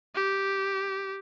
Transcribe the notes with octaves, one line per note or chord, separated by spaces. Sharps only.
G4